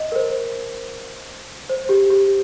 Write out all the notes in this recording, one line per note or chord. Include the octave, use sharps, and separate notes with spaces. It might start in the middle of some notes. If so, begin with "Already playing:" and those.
Already playing: D#5
A#4
C5
C5
G4
G4